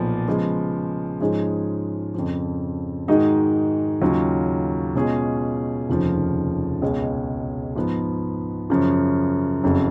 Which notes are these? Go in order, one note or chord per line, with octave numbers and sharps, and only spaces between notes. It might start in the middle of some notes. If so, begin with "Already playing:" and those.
Already playing: B1 A#2 F3 B3
C#3 F3 G#3 B3
G#2 F3 G#3 C#4 G#4
F2 C#3 F3
G#2 D#3 G#3 D#4 F#4
D#2 C#3 F#3 C#4 F4
B2 G#3 C#4 F4 G#4
F1 D#2 C#3 F3
C#2 B2 G#3 C#4
G#2 F3 B3
F#2 C#3 F3
F#1 F2 C#3 F#3